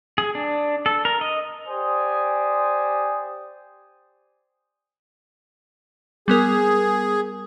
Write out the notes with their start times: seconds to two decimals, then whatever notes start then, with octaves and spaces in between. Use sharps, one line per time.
0.18 G#4
0.35 D4
0.86 A4
1.05 A#4
1.21 D#5
1.67 G4 C5 D5 G#5 D#6
6.28 G3 B3 G#4 A#4